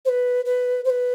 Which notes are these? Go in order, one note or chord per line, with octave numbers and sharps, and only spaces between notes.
C5
B4
B4
C5
B4